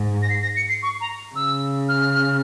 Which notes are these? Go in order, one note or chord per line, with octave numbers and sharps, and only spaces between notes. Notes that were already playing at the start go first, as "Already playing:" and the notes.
Already playing: G#2
A#6
C7
A#6
C#7
C7
C#6
A#5
C#3 E6
F6